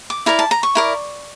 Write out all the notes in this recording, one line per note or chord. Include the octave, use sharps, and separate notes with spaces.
D6
E4 A#4 D5 A#5
A5
A#5
C#6
E4 A#4 D5